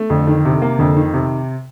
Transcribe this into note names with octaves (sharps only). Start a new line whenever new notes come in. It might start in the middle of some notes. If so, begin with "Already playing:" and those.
Already playing: A3
F2 D3
D#3
C3
A#3
F2 D3
D#3
C3